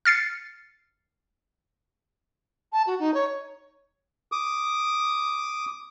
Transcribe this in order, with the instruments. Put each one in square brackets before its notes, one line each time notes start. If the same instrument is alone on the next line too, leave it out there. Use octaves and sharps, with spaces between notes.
[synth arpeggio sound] F6 A6 C7 C#7
[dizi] A5
F#4
D#4
C#5
[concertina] D6 D#6